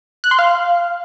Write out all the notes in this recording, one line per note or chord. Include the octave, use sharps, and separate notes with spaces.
F#6
C6
F5